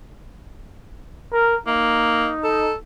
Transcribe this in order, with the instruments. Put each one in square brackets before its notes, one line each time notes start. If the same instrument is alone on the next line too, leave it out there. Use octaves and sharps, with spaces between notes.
[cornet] A#4
[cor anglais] A#3 [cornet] D#4
[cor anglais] A4